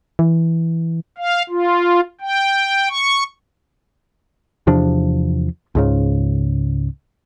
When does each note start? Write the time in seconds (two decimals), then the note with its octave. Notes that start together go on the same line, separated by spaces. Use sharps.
0.19 E3
1.18 F5
1.49 F4
2.21 G5
2.89 C#6
4.67 E2 C3 F3 D4
5.75 C#2 G#2 C#3